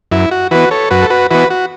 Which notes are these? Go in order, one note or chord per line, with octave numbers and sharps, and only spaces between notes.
F#2 E4
F#4
E3 B3 F#4 B4
A4 C#5
F#2 F#4 B4
A4
F#4 B4
E3 B3 F#4 B4
F#4